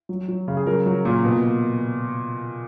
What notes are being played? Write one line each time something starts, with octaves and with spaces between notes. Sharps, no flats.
F#3
F#3
C#3
G#4
F#3 A#4
F#3
A#2
B2